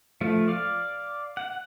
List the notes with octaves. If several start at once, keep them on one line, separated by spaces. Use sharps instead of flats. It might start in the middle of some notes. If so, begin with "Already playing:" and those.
F3 A3 F4
D5 F5
F#5